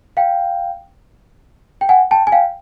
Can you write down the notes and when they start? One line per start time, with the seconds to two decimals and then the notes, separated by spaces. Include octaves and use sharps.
0.17 F5 G5
1.81 G5
1.89 F#5 G#5
2.11 G5 A5
2.27 G#5
2.32 F5 G5